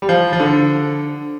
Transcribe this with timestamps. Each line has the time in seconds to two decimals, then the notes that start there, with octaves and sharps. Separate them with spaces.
0.02 G3
0.09 F3
0.33 F3
0.40 D3